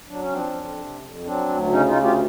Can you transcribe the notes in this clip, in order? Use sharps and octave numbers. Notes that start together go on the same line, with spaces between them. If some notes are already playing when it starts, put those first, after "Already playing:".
F#3 D4
C#4
F3 C4 D4
F2
C3
F2
F#3 C4 D4
D2
C#3 C#4 D#4
D#4 F4
D2
F4 G4